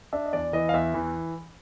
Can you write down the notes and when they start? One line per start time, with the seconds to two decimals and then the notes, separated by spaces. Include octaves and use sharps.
0.13 D4 E5
0.26 D#5
0.33 E2 D5
0.53 E3 D#5
0.69 F5
0.74 E2 E5
0.94 E3